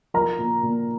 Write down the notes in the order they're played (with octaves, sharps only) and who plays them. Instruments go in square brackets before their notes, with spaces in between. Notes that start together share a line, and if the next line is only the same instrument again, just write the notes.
[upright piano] F3 A#4 A#5
A#2
A#2